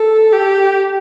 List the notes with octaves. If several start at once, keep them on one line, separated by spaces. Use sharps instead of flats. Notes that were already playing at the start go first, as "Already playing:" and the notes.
Already playing: A4
G4